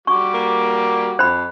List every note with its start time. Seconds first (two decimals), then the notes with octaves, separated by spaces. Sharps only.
0.07 G3 F#4 C#6 D6
0.34 A#3
1.19 F2 C5 B5